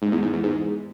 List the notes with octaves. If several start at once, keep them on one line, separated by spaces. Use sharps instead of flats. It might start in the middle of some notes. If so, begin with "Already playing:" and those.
G#2
E2
G#2
E2
G#2